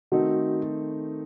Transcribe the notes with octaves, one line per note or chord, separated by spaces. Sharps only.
D#3 A3 C4 D#4 F#4 A4